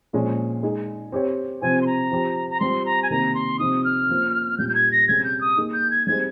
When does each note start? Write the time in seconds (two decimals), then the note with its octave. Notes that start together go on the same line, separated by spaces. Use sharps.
0.13 A#2 F3 G#3 C#4
0.63 G#3 D#4 G#4
1.12 C4 G4 C#5
1.62 C3 F3 C4 G#5
1.82 C6
1.86 A#5
2.12 F3 C4 G4
2.50 A#5
2.60 G3 C4 F4 C6
2.86 A#5
3.03 G#5
3.10 C3 D#3 A#3 D#4 A#4 A#5
3.35 C6
3.59 C3 F3 C4 D#4 D#6
3.84 F6
4.09 F3 A#3 C#4 F4 C5
4.58 A#2 G3 C#4 F4 G6
4.69 G6
4.75 G#6
4.92 A#6
5.08 C3 G3 C#4 G#4 G#6
5.24 G6
5.41 D#6
5.57 A#3 D#4 G#4
5.73 G6
5.91 G#6
6.07 G3 C4 D#4 G#4 C5 G#6